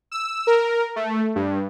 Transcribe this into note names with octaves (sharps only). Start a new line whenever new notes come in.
E6
A#4
A3
G2